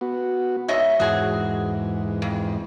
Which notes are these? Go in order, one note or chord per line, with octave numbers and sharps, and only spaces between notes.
B3 F#4
G#2 C#5 D#5 E5
E2 G#2 F#4 G#4
F2